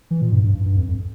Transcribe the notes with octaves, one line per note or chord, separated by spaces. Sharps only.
E3
A#2
G2
G2
G2
G2
F2
F2